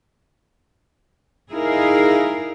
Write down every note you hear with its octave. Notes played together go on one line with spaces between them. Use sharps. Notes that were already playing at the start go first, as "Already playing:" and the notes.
D#4 E4 G#4 A#4 F5